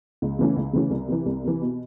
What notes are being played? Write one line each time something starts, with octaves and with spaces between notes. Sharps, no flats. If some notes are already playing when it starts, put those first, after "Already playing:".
C#2
C#3 E3 A3 C#4
C#2
C#3 E3 A3 C#4
C2
C3 E3
C2
C3 E3
B2